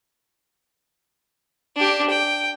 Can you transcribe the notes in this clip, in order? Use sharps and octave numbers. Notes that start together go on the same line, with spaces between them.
D4 G4
G5